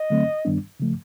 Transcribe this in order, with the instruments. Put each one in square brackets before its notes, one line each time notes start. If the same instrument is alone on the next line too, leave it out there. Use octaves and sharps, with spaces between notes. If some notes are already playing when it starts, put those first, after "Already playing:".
Already playing: [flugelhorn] D#5
[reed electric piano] D3 F#3 A3 C4
G2 D#3 G3 B3 D4
C#3 F3 A3